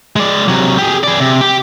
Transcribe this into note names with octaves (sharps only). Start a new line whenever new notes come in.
G#3 D5
C3 F#3
G4 G#4
G#4 D5
C3
G4